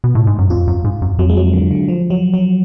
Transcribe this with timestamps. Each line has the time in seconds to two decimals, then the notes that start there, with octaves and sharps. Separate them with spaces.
0.04 B2
0.15 A2
0.27 G#2
0.38 F#2
0.50 F2 F4
0.68 F#2
0.84 G#2
1.02 F#2
1.19 F2 F#3
1.29 G#3
1.37 F#3
1.53 D3
1.71 D3
1.88 F3
2.10 F#3
2.34 F#3